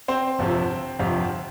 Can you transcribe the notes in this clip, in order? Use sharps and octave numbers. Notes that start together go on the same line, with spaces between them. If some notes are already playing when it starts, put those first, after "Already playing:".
C4 C5
G1 F2 C3 F3
G1 F2 C3 F3